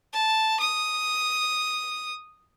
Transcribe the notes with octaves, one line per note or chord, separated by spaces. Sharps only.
A5
D#6